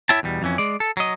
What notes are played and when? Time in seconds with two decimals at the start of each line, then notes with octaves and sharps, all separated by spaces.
0.09 E4 C#5 E5 G5 A5
0.23 E2 B2 G3
0.42 F2 E3 C#4
0.58 G#3 D5
0.80 A4
0.97 F#3 D#5